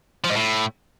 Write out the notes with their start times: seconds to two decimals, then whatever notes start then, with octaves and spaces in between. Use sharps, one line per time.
0.24 F3
0.30 G#2
0.35 A2